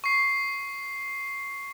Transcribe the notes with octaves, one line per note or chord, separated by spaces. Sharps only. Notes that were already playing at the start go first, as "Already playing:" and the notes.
C#6 C7